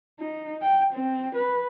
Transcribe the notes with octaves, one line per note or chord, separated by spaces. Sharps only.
D#4
G5
C4
B4